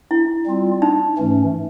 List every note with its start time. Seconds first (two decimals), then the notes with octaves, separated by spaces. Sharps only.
0.11 E4
0.46 G3 C4 F4
0.82 D#4
1.17 G#2 E3 A3 C#4